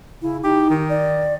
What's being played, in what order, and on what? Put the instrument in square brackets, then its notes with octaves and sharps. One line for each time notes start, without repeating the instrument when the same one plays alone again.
[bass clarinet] C#3 [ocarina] E4
[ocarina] D#4 [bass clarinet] G4
[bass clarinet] D#3
[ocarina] D5